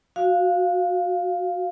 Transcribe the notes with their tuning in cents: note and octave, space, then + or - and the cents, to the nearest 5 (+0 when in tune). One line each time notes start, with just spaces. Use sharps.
F#4 -15 F5 +0